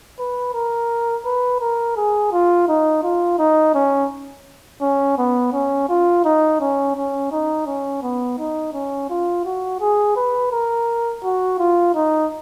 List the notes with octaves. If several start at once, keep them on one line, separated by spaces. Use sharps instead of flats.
B4
A#4
B4
A#4
G#4
F4
D#4
F4
D#4
C#4
C#4
B3
C#4
F4
D#4
C#4
C#4
D#4
C#4
B3
D#4
C#4
F4
F#4
G#4
B4
A#4
F#4
F4
D#4